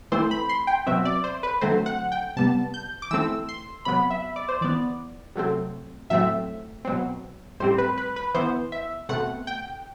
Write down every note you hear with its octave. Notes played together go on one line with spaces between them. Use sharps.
E3 A3 C4 C5
B5
C6
G5
B2 F#3 C4 E5
D5
C5
B4
D3 F#3 A3 C4 C5
F#5
G5
C3 G3 B3 A5
G6
D6
E3 A3 C4 E6
C6
C3 F#3 B3 B5
E5
D5
C5
E3 B3 D5
C3 F#3 A3 C4
A2 F#3 A3 C4 E5
B2 F#3 C4
A2 G3 C4 C5
B4
B4
B4
E3 B3 C5
E5
B2 A3 C4 F#5
G5